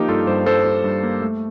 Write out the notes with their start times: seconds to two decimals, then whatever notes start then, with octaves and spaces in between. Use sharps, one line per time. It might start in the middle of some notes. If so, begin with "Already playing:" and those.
Already playing: F3 A#3 D#4 G4
0.08 G2 F4 A4
0.27 G2 A4 C5
0.46 G2 A4 C5
0.66 G2
0.84 G2
1.03 A#3
1.22 A3